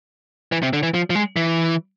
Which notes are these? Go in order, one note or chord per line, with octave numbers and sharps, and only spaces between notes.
E3
C3
D3
E3
F3
F3
G#3
E3